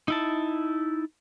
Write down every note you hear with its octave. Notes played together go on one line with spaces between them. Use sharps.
D#4 E4 A5